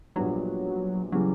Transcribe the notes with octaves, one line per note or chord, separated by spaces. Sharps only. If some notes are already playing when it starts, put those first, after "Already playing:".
A#1 A#2 F#3 G3 B3 D4
C#3 E3 F#3 G3